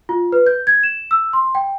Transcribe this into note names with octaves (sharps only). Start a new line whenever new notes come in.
F4
B4
G6
G#6
E7
E6
C6
G5